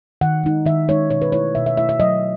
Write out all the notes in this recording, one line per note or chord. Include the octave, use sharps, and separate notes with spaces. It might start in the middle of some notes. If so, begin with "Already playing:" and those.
D#3 F#5
G#3 D#4
D#3 E5
G#3 D#4 C#5
B2 C#5
B4
A3 E4 C#5
B2 E5
E5
A3 E4 E5
E5
F#3 D#5